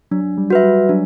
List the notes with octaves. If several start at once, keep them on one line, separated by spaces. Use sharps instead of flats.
F#3 D4
G3
F#4 B4 E5
G3
F#3 D4